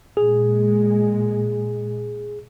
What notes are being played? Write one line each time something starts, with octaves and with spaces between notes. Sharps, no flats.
A#2 G#3 G#4